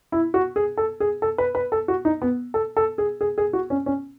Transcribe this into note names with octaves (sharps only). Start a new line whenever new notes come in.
E4
F#4
G#4
A4
G#4
A4
B4
B4
A4
F#4
D#4
B3
A4
A4
G#4
G#4
G#4
F#4
C#4
C#4